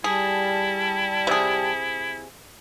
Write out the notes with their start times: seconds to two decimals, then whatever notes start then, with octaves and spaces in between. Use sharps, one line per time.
0.04 G3 E4 G#4 A5
1.27 C3 G#4